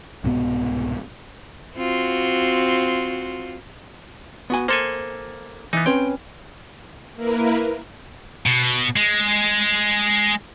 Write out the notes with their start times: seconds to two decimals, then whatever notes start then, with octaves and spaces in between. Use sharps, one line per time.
0.24 C2 G#2 B2 B3
1.77 C4 F4 F#4
4.50 B3 F#4 G#5
4.68 A#3 A4 C5 G#5
5.73 E3 B3 D#4
5.86 C4 C#4 B4 G5
7.15 A#3 E4 A#4 B4
8.46 B2
8.96 G#3